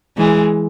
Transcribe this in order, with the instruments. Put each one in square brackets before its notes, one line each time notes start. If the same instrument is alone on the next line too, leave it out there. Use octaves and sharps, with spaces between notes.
[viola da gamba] E3 G#3